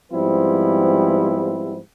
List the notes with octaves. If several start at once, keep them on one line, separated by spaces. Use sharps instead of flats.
G#2 F3 G3 B3 C4 E4